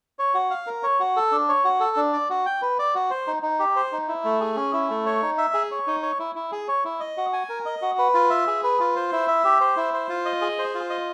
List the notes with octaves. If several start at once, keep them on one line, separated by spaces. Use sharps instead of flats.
C#5
F#4
F5
A#4
C#5
F#4
A4
D4
C#5
F#4
A4
D4
D5
F#4
G5
B4
D5
F#4
C5
D#4
D#4
G4
C5
D#4
E4
A3
G#4
C#4
E4
A3
C#5
D#4
E5
G#4
C#5
D#4
C#5
E4
E4
G#4
C#5
E4
D#5
F#4
G#5
A#4
D#5
F#4
B4
F4
E5
G#4
B4
F4
C5
E4
E5
G4
C5
E4
C5
F4
D#5
G#4
C5
F4
D#5